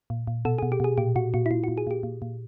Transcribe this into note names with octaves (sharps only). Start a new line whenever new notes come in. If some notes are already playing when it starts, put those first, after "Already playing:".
A#2
A#2
B2 A4
B2 G#4
G4
B2 G#4
A#2 G4
A#2 F#4
A#2 F#4
E4
A#2 F4
A#2 F#4
G#4
A#2 G4
A#2
A#2